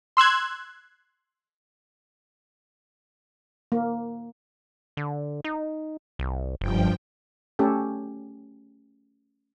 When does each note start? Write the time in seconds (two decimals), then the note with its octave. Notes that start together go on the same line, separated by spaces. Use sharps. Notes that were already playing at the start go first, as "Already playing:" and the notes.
0.17 C6 E6 F#6 G#6
3.72 A#3
4.97 D3
5.44 D#4
6.19 C2
6.61 F#1 G2 F3 G5
7.59 A3 C#4 G4 A4